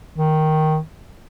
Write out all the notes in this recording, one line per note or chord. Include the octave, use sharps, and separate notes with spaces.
D#3